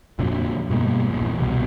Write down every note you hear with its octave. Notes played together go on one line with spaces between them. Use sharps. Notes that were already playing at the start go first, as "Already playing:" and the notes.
F2 A#2 D3 F#3
G2 B2 G#3 A#3
A#1 E2
C2 B2